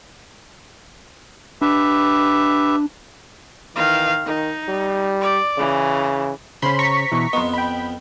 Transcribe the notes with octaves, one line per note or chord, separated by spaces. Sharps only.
D4 G4 B4 E5
D#3 E3 F5
D#3 D#4
G3
D5
C#3 E3
C#3 C#4 C5 B5 C6
A#5 C#6 B6
B2 E3
F2 B3 D#5 C6
G5 B5